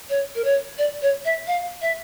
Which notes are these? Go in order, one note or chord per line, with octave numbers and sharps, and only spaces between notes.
C#5
A#4
C#5
D5
C#5
E5
F5
E5